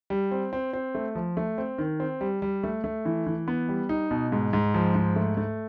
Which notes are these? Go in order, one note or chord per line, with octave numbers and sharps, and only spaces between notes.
G3
C4
C4
C4
A3
F3
A3
C4
D#3
C4
G3
G3
A3
A3
E3
E3
B3
G3
D#4
B2
G#2
G#2
F3
G#2
A3
A3